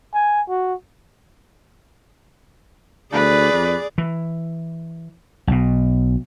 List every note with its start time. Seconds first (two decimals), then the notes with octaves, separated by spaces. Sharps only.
0.14 G#5
0.49 F#4
3.13 D2 G#4 B4 D5
3.53 F2
3.98 E3
5.47 B1 B2